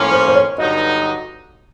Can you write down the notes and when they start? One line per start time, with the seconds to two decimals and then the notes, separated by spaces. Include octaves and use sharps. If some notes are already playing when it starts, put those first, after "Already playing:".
Already playing: A2 F3 A#3 C#4 F4
0.12 C5
0.28 C5
0.35 C#5
0.58 G2 D3 F#3 B3 D#4 D#5